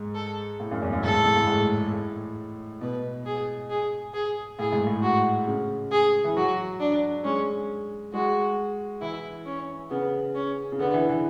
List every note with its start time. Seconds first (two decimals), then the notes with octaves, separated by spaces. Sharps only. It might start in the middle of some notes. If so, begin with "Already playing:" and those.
Already playing: G#2
0.15 A4
0.60 A2
0.71 F#2
0.82 E2
0.93 F#2
1.04 G#2 A4
1.14 A2
1.25 G#2
1.36 A2
1.47 G#2
1.93 A2
2.81 B2 B4
3.26 G#4
3.70 G#4
4.14 G#4
4.59 A2 G#4
4.73 G#2
4.87 A2
5.03 F#4
5.47 C#3
5.92 G#4
6.24 E3
6.36 F#3 F#4
6.80 D4
7.24 G#3 C#4
8.13 G#3 F#4
9.01 E3 E4
9.46 C#4
9.90 C#3 B3
10.35 C#4
10.72 C#3
10.79 D3 B3
10.94 E3
11.09 E3